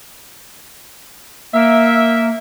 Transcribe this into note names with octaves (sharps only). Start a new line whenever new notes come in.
A#3 E5